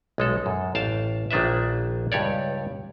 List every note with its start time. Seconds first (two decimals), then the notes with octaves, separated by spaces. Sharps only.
0.18 B1 G#3 A4
0.46 F#2
0.75 A1 F5 G5 A5
1.31 A#1 D#3 D4 B4 E5
2.12 C#2 G2 G4 C#5 D5